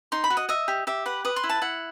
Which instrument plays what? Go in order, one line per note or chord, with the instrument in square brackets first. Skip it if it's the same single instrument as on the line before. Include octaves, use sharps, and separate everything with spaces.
[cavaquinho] D#4 C6
B5
F#4
D#5
D#5 E5
G4
G4 E5
B4 F#5
B4 D#6
C6
E4
A5
E4 F#5